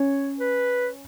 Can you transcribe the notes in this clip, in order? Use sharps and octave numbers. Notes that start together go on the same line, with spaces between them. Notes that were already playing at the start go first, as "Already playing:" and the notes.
Already playing: C#4 C#5
B4